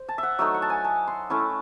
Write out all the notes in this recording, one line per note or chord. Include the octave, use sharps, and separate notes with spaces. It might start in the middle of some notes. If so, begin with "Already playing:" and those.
Already playing: C5
A5
E5
F#5
F#3 A3 D#4 E5
F#5
A5
G#5
A5
C6
A3 C#4 E4 A5